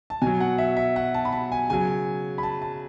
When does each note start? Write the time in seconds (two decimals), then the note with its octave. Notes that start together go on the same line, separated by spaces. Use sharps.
0.10 A5
0.22 B2 F#3 G#5
0.40 F#5
0.58 E5
0.77 E5
0.96 F#5
1.14 A5
1.25 B5
1.32 A5
1.52 G#5
1.70 C#3 F#3 G#5
2.38 B5
2.43 A5
2.62 A5